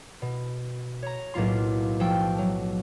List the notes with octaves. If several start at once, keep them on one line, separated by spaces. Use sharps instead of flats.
B2
C#5 A#5
B1 A2 A#3 F4 C6
F3 A3 G5 E6
F#3